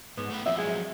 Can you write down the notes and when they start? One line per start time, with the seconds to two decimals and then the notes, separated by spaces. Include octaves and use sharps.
0.17 G#2 B3
0.30 A3 B4
0.46 F3 F#3 C4 E5
0.58 G#3